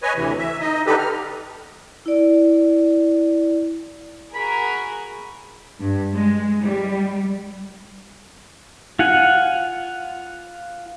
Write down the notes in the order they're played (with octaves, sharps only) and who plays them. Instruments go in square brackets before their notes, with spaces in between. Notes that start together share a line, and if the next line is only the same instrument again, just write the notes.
[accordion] B4 C#5 D#5 G#5
D2 C3 E3
E5
D#4 D#5
D3 D#4 G4 A4 B4
F6
[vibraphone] E4 D5
[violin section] F#4 G#4 A#4 [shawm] B5
[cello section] G2
G#3
G3
[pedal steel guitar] F4 F#5 G#5